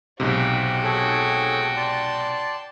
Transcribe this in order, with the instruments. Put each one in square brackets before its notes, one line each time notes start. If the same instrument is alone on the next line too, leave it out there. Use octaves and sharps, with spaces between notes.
[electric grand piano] B1 G#2 C3 [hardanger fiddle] F#4 G5
[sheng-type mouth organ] G#4 A4 C#5
D5 A5 C6